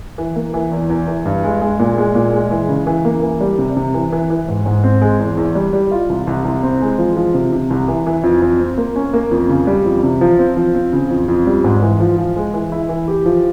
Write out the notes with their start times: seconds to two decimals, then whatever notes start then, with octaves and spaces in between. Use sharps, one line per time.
0.18 E3
0.36 A#3
0.54 E3
0.72 E2
0.90 E2
1.07 E3
1.25 G2
1.44 G#3
1.61 G#3
1.79 A#2
1.97 G#3
2.15 A#2
2.33 G#3
2.51 E3
2.69 C#3
2.87 E3
3.05 A#3
3.22 E3
3.40 G3
3.58 C3
3.77 C3
3.94 E3
4.12 E3
4.30 E3
4.48 G#2
4.66 G#2
4.84 C4
5.02 G#3
5.19 E2
5.37 E2
5.55 G3
5.73 G3
5.91 F4
6.09 C2
6.27 C2
6.45 C2
6.63 C4
6.81 G#3
6.98 F3
7.17 F3
7.34 C3
7.52 C3
7.70 C2
7.88 E3
8.07 E3
8.24 F2
8.42 F2
8.60 C4
8.78 A#3
8.96 C#4
9.13 A#3
9.31 F2
9.49 C#3
9.67 G3
9.85 F2
10.03 C3
10.21 F3
10.39 C4
10.57 F3
10.75 C4
10.93 C#3
11.11 F2
11.28 F2
11.46 G3
11.64 G#2
11.82 E3
12.00 F3
12.18 F3
12.36 G#3
12.54 E3
12.72 E4
12.89 E3
13.08 G4
13.26 F3